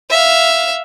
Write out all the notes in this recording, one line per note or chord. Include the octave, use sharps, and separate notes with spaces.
E5 F5